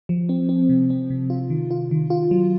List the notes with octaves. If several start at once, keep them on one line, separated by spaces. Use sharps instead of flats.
F3
C4
C4
C3
C4
C3
F4
D#3
F4
D#3
F4
F#3